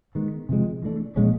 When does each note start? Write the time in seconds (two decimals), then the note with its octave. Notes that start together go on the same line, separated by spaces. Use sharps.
0.15 D#3 G#3 B3
0.49 C3 F3 G#3
0.83 E3 A3 D4
1.16 A#2 F3 G#3 C#4